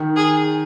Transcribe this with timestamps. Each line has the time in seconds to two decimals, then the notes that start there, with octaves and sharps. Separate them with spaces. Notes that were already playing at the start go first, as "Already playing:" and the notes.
Already playing: D#3
0.16 G#4